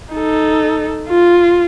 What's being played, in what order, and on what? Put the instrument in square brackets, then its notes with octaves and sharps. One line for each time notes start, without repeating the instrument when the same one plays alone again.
[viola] D#4 A4
F4